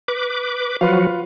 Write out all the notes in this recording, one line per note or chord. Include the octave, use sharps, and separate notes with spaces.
B4 D6
F3 F#3 F4 F#4 B4 F5